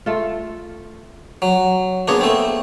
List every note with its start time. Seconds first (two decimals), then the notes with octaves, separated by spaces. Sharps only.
0.06 A3 F4
1.42 F#3
2.08 A#3 B3 D4 G#4 C#5
2.21 A3 C4